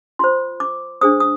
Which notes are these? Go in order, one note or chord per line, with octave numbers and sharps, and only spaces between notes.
F4 C5 C6
D6
D4 G#4 C5 D#6
D#6